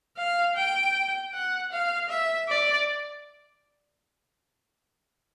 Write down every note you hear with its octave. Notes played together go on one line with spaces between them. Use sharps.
F5
G5
F#5
F5
E5
D5